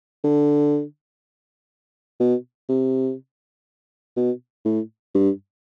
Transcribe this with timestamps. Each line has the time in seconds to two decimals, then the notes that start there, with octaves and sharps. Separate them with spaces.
0.24 D3
2.20 B2
2.69 C3
4.16 B2
4.65 A2
5.15 G2